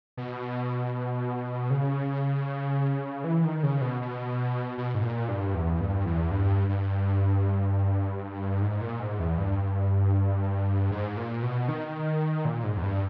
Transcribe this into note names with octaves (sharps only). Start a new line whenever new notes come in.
B2
C#3
E3
D#3
C#3
B2
B2
B2
G#2
A#2
G2
E2
G2
E2
G2
G2
G#2
A#2
G#2
E2
G2
G#2
A#2
B2
D#3
A#2
G#2
E2
G2